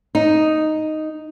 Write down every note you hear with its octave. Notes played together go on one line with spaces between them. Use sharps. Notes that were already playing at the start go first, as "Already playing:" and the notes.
D#4